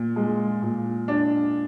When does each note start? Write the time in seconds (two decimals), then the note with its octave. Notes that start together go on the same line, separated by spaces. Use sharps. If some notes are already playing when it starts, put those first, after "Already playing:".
Already playing: A#2
0.16 G#3
0.62 A#2
1.08 D4